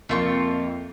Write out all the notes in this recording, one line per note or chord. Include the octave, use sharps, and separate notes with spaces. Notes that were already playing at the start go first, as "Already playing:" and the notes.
F2 A3 A#3 F4 C#6